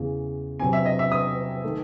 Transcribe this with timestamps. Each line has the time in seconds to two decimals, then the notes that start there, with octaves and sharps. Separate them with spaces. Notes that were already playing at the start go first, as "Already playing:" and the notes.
Already playing: E2 C#3 E3
0.59 C3 F#3 C4 G#5
0.73 E5
0.85 D#5
0.99 E5
1.12 D#6
1.64 D#3 A3